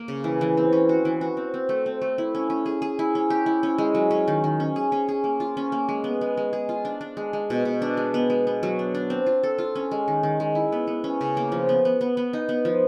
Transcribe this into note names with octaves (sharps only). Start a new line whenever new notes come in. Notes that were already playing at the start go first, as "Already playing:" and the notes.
Already playing: A#3
C#3
E3
E3
C4
C#4
F#4
E3
F#4
C4
C4
A3
C4
A3
E4
C#4
C#4
G#4
G#4
E4
C#4
G4
E4
C#4
G#3
F#3
C#4
D#3
D#3
C#4
G#4
C#4
G#4
A#3
F4
C#4
A#3
G#3
B3
G#3
G#3
G#4
F4
D4
D4
G#3
G#3
B2
B2
D4
G#3
B3
G#3
B3
F#3
D4
D4
C4
F4
A4
F4
C#4
G#3
D#3
D#3
G#3
E4
B3
B3
C#4
C#3
A#3
F3
B3
B3
B3
B3
D#4
B3
F3